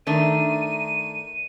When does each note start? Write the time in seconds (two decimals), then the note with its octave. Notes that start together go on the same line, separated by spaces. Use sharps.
0.07 D#3 A3 D4 D#7